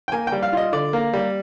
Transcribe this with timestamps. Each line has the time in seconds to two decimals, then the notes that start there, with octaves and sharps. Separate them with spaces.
0.08 G5
0.12 A#3 G#5
0.27 G5
0.32 G3
0.43 F5
0.53 F4 D#5
0.73 D3 D5
0.93 A#3
1.13 G3